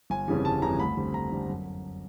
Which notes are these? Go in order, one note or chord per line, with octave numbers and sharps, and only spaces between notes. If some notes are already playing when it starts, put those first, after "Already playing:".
G1 G#5
F2 C#3 E3 G3
G1 A5
F2 C#3 E3 G3 A#5
D2 B5
D3 G3 C4
D2 A#5
D3 G3 C4
F#2